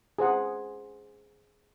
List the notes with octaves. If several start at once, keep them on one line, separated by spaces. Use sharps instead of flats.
G#4 C5 F#5